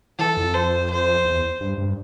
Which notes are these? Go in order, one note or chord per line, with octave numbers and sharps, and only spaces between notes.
E3 A4
F2
C5
C5
E2
G2
G2